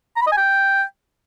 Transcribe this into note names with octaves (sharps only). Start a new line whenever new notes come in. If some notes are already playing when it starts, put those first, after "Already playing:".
A#5
B5
D#5
G#5
G5